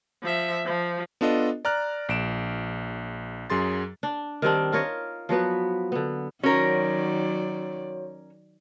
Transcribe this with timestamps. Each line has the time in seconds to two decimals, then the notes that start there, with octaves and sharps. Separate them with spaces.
0.23 F3 E5
0.66 F3
1.21 B3 D4 F4 A4 D#5
1.65 D5 A#5 F6 F#6
2.09 A#1 D7 E7
3.50 F#2 F#3 G#4 C6 A6
4.03 D4
4.42 D#3 G3 C4 D4
4.72 F4 A#4 C#5 D#5
5.29 F3 F#3 B3 B4
5.92 D3 B3
6.43 D#3 F#3 C#4 F#4 A#4 C#5 D5